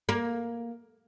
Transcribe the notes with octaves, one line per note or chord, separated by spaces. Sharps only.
A#3